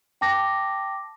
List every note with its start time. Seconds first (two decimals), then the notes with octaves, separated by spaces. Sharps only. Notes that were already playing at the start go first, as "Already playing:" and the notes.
0.21 G5 A5 D6 A#6